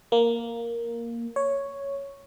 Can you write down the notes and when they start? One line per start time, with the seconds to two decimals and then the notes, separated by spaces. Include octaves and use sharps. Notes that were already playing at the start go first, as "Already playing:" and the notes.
0.12 A#3
1.36 C#5